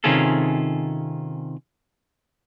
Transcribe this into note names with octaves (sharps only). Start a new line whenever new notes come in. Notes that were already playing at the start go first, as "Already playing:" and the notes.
C3 D#3 C#4 F4 G#4 A4